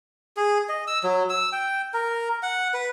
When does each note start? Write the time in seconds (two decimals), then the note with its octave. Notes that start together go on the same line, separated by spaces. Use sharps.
0.37 G#4
0.69 D#5
0.87 E6
1.04 F#3
1.29 E6
1.52 G5
1.94 A#4
2.43 F#5
2.74 B4